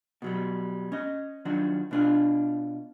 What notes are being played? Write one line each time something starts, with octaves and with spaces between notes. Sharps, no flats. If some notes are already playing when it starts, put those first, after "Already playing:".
B2 F#3 G3
C#4 D#5
D#3 F3 F#3 D4 F#4
B2 D4 F4